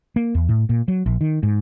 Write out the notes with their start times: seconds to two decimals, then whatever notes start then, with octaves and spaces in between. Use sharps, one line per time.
0.16 A#3
0.35 E2
0.49 A2
0.69 A#2
0.88 F#3
1.06 A#1
1.21 D#3
1.43 G#2